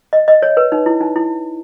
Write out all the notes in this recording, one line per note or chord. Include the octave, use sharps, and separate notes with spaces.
D#5
D#5
C#5
B4
D#4
E4
D#4
E4